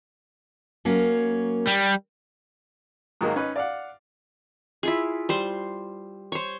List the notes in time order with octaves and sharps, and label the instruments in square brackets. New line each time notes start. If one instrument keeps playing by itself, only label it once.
[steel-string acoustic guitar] F#3 A#3 C#4
[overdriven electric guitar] G3
[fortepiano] G#2 D#3 F#3 G#3 A#3
C#4 D#4 B4
D5 F5 F#5
[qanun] E4 F4 G#4
G3 C5
C5 C#5